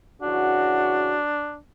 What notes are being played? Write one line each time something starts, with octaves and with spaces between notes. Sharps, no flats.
C#3 E3 D4 F#4